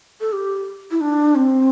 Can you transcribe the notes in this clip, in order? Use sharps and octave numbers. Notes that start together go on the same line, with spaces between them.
A4
G4
E4
D4
C4